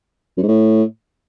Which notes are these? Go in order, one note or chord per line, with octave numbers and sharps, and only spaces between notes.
F#2
G#2
A2